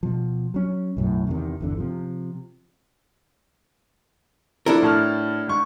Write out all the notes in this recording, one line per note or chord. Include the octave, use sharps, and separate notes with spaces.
B2 F3
F#3 C#4
B1 F#2 A2
E2 C3 D#3
G1 E2 D3
C3 F3
F3 D4 E4 A4 A#4
A2 A5 F6
G#2 C#6